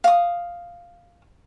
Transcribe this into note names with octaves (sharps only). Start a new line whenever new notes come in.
F5 D#6